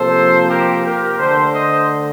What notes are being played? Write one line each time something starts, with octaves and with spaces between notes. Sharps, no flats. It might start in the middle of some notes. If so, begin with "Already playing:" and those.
Already playing: C3 F3 A#3 A4 C5
G4 A#4
G4 A#4
D3 A3 A4 C5
C5 D#5